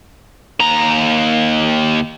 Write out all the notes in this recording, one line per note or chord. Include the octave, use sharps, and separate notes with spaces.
D#2 A#5